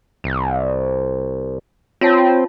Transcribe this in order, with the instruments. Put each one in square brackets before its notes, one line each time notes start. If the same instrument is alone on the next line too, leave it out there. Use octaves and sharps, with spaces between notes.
[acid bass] C2
[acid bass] C4 [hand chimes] F4 C#5 A5